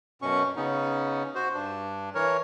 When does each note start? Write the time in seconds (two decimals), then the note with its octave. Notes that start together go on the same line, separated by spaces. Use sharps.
0.22 F#2 B2 C#4 C#6
0.56 C#3 B3 C#4 D#4
1.35 F#4 C5
1.54 G2 D4
2.15 E3 A#4 C#5